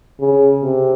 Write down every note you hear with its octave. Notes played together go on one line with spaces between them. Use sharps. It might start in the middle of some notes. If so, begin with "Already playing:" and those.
C#3
C3